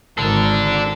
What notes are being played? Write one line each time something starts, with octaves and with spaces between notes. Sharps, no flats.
G#1 D#3 D4 A4